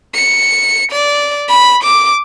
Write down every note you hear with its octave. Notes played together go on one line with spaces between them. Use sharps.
C#7
D5
B5
D6